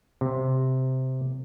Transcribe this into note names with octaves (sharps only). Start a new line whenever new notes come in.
C3